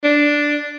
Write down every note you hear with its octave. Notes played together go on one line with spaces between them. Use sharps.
D4